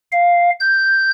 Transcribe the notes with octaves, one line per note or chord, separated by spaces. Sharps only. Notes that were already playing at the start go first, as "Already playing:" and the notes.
F5
G6